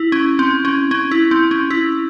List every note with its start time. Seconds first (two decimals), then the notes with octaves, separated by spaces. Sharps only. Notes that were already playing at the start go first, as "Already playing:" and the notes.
Already playing: E4
0.12 C#4
0.39 C4
0.65 C#4
0.91 C#4
1.11 E4
1.31 C4
1.51 C#4
1.70 E4